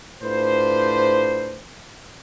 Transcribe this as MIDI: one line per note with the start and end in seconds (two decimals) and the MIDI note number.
0.22 1.61 45
0.22 1.61 62
0.22 1.61 65
0.22 1.61 71
0.22 1.61 72